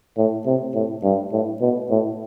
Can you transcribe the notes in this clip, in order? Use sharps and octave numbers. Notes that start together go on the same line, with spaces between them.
A2
C3
A2
G2
A2
B2
A2